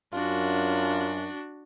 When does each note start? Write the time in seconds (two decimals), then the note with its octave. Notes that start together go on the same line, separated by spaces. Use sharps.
0.13 F#2 D4 F4 F#4